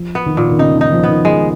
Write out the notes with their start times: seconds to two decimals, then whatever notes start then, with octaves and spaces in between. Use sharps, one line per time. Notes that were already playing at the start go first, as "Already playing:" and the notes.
Already playing: F3
0.15 B3
0.26 D#3
0.37 A#2
0.51 D#3
0.58 C#3 D#4
0.76 D#3
0.81 D#4
0.92 F3
1.03 B3
1.09 D#3
1.25 G#3